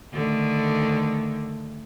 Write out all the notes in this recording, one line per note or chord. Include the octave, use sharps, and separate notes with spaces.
D3 D#3 A3